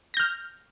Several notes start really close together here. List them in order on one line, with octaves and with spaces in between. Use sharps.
A#6 G6 F6